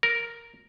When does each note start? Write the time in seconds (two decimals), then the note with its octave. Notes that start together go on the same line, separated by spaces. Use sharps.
0.03 A#4